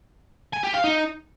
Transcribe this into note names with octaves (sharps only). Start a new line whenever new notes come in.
G#5
G4
F5
D#4